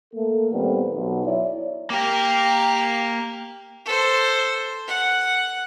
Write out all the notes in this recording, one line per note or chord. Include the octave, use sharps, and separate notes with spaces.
A3 A#3 A4
A#2 D#3 G3 A3 B3 C4
B1
E4 C#5 D5 E5
A#3 G4 A#4
A4 C5
F#5